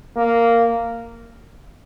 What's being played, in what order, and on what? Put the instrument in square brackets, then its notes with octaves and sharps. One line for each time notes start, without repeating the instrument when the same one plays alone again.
[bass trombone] A#3